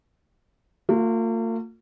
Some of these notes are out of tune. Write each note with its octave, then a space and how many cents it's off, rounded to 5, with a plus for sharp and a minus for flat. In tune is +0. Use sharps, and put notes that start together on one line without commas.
A#3 -45 F4 +30